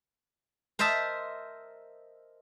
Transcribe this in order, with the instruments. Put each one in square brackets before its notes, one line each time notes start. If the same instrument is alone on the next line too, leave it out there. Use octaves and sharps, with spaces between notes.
[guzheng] A#4 C5 D#5 E5 A5